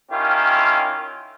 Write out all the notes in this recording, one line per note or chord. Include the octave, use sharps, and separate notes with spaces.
D#3 C#4 E4 F4 G4